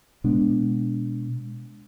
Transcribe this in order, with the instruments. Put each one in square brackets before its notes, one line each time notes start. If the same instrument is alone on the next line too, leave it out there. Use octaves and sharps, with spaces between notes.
[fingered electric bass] B2 G#3 B3 D4